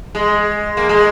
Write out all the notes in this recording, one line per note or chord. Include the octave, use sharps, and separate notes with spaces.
G#3
A#3
G#3